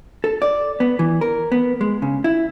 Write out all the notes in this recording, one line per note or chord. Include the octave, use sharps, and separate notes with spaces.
A4
D5
B3
E3
A#4
B3
G#3
C#3
E4